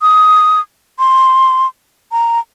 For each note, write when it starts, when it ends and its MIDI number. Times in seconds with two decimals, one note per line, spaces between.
0.02 0.60 87
0.99 1.67 84
2.12 2.39 82